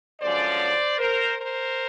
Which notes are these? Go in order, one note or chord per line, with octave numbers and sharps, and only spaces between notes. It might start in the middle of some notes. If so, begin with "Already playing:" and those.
F#2 D3 F3 G#3 C#4 C5 D5
A#4 C5
A#4 C5